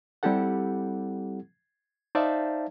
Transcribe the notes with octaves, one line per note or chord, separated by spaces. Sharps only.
G3 C4 E4 G4 A4 F#5
D#4 C5 D5 E5 F5 A5